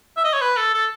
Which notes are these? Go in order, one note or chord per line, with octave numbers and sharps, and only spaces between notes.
E5
D#5
C#5
B4
A4
A4